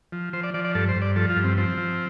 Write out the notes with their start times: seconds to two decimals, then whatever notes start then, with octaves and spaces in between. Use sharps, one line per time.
0.12 F3
0.33 F3 C5
0.43 D5
0.54 F3 D5
0.65 D5
0.75 G2 A4
0.89 C5
0.96 G2
1.02 D5
1.16 F3 A4
1.29 F4
1.36 G2
1.44 C4
1.57 F3 C4
1.77 F3